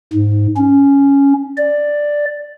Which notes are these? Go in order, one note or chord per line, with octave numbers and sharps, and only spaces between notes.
G#2
C#4
D5